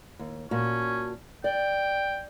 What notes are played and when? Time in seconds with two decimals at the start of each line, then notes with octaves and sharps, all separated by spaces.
0.19 D#2
0.51 A#2 C#4 F#4 A5
1.44 D5 G5